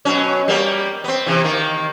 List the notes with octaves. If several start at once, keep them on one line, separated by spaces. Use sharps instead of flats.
B2 F#3 C#4
G3 A#3 B3
B3 C4
C3 E3
D#3 A#3